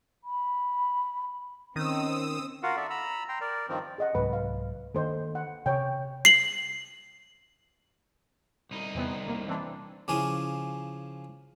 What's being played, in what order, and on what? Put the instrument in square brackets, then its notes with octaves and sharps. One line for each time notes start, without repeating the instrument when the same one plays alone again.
[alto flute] B5
[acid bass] D#3 [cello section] C4 C#4 [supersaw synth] D#6 E6
[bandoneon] F4 F#4 A#4 F5 F#5
A4 D5 E5
A#5 B5 E6
G5 A#5 C6
A#4 D5
G2 D#3 F3 C4
[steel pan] G#4 D#5 F#5
[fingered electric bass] C2 G#2 F#3 [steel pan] B4
[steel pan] F5
[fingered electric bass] D#3 A#3 D4 [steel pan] A4 C5 D#5
[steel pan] F#5
[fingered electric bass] C3 [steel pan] C#5 G5
[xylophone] C7 F#7
[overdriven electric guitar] C2 D#4
[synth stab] E2 C3 B3
C3 A#3
E3 C4 D4
[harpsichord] C#3 F3 G#4 [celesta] E4 D6